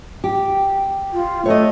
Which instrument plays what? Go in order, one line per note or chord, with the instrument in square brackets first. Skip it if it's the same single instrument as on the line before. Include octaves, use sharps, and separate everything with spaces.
[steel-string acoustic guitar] G4
[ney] F4
[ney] A3 [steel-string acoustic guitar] C#5 D#5